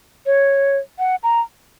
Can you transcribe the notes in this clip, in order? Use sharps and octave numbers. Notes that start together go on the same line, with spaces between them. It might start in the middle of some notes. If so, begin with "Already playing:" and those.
C#5
F#5
A#5